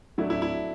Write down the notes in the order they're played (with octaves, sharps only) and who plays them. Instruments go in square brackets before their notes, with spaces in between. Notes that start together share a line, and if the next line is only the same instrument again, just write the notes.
[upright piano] F#3 A3 D4 [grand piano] E4
[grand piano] E4
E4